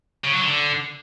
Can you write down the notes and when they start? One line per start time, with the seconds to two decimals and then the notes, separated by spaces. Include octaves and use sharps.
0.25 C#3
0.34 F#3
0.43 D3